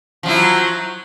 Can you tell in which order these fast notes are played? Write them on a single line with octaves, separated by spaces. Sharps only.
F3 F#3 E4